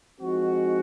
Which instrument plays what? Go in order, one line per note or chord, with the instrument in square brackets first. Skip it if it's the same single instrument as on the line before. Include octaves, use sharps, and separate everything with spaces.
[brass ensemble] F3 G#3 C4 D#4 F#4